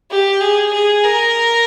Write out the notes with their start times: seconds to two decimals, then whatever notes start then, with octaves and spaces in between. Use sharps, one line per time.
0.10 G4
0.41 G#4
0.72 G#4
1.03 A#4